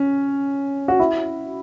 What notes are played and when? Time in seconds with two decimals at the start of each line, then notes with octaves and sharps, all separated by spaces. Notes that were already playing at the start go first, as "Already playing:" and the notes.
Already playing: C#4
0.88 F#4
0.99 E4